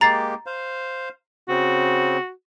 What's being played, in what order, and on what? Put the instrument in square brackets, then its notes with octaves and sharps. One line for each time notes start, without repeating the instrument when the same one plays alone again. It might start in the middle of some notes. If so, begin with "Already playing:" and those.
[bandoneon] G#3 A#3 G4 [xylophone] A#5 A6 C7
[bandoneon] C5 F5
[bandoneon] C#3 C4 [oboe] F#4